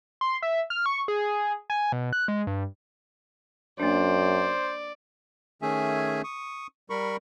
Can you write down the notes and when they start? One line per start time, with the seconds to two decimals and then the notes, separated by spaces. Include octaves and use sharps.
0.21 C6
0.42 E5
0.70 F6
0.86 C#6
1.08 G#4
1.70 G#5
1.92 B2
2.13 F#6
2.28 G#3
2.47 G2
3.80 F#2 A#3 D4 C5 D5
5.62 D#3 A3 C#4 G#4 E5 G#5
6.24 C#6 D#6
6.90 G3 A#4 B5 C#6